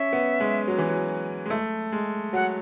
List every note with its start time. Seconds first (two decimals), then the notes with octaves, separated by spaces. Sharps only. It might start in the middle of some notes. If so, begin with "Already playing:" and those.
Already playing: C#4 E5
0.13 B3
0.40 G#3
0.68 F#3
0.78 E3
0.89 F#3
1.46 G#3
1.50 A3
1.92 G#3
2.33 F#3 F#5